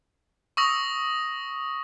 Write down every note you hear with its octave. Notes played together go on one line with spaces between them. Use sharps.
C#6 D#6 E6 A#6